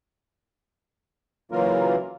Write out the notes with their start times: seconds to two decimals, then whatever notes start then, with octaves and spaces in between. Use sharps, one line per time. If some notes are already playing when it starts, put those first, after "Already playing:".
1.52 C#3 E3 F#3 A#3 F4 A#4